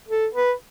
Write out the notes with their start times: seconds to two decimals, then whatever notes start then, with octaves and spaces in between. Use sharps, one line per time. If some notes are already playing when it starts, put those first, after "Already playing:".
0.08 A4
0.34 B4